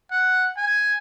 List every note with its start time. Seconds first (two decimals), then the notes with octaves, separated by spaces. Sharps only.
0.11 F#5
0.57 G#5